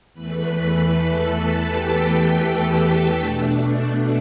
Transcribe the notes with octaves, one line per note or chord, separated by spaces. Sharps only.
E2 E3 A3 B4 B5
A4 A5
G4 G5
A4 A5
B2 A3 D4